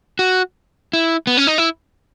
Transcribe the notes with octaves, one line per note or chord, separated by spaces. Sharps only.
F#4
E4
B3
C#4
D#4
E4